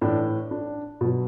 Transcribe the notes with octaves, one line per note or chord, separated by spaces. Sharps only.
A2 E3 D4
D4
B2 F#3